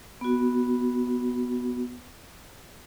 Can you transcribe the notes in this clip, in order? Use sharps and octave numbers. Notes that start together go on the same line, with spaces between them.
B3 F#4